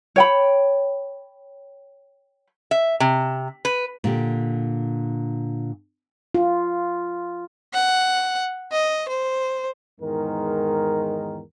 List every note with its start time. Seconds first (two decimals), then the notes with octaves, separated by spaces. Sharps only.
0.16 C#5 G5 B5
2.71 E5
3.00 C3
3.65 B4
4.04 A#2 D3 G4
6.35 F4
7.73 F#5
8.72 D#5
9.08 C5
10.00 E2 G#2 D#3 G#3 A#4